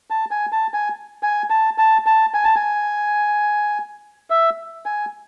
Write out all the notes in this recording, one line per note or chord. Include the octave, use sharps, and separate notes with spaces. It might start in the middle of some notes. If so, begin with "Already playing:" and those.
A5
G#5
A5
G#5
G#5
A5
A5
A5
G#5
A5
G#5
E5
G#5